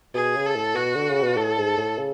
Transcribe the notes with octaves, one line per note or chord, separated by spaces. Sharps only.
B2 G#4
C#3
A4
A2
B2 F#4
D3
C#3
B2
A2 A4
G#2
A2
C#3